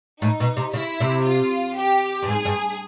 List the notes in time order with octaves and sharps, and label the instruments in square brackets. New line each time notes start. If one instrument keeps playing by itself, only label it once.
[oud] A2 [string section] D#4
[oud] B2
C3
[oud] C#3 [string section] E4
[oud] C3
[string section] F4
G4
[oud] G2
[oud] G#2 [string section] G#4
[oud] G2